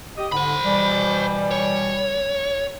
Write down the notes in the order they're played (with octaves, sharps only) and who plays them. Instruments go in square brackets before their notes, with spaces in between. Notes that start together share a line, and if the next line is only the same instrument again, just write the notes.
[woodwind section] G4 D#5 D#6
[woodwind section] G#2 D3 [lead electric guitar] C5 B5
[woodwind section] B2 E3 G3
[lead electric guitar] C#5